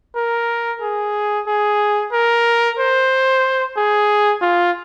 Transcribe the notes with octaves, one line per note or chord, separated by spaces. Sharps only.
A#4
G#4
G#4
A#4
C5
G#4
F4